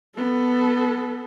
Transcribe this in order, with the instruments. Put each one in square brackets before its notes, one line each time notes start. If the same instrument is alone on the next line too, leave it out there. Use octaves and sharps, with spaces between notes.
[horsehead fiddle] B3 A4